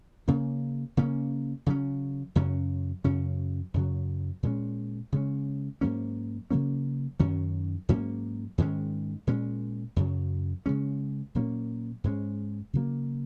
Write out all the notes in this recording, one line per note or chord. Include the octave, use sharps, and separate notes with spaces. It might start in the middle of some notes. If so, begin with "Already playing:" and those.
C#3 A#3 C#4
C#3 A#3 C#4
C#3 F#3 C#4
F#2 C#3 F#3 C#4
F#2 C#3 F#3 C#4
F#2 C#3 F#3
A#2 G#3 C#4
C#3 G#3 C#4
G#2 F#3 A#3 C#4
C#3 F#3 A#3 C#4
F#2 D#3 F#3 C#4
G#2 F#3 A#3 C#4
G#2 D#3 G#3 C#4
A#2 G#3 C#4
F#2 C#3 F#3
C#3 G#3 C#4
A#2 F#3 A#3 C#4
G#2 G#3 C#4
C#3 F#3 A#3